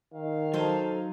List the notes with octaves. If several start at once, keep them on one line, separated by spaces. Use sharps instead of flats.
D#3 F5
F#3 D#4 A4 C5